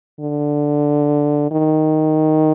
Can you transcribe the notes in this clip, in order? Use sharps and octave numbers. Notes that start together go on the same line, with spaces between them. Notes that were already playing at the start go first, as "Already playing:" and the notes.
D3
D#3